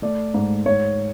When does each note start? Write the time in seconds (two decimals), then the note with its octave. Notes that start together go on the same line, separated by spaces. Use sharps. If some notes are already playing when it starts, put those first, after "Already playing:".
0.02 A3 D5
0.34 G#2
0.66 G#2 C#5